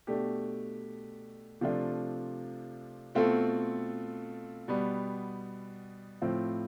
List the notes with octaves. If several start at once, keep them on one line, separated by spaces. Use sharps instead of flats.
B2 A3 D4 G4
C3 F3 A3 D4 F4
B2 A3 C4 F4 A4
B2 G3 B3
A2 F3 C4 F4